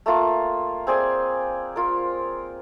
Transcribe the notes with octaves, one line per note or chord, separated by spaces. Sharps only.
A3 A#3 F4
C4 G#4 D5 G#5
F4 A#4